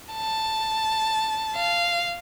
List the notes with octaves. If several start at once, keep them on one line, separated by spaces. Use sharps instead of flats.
A5
F5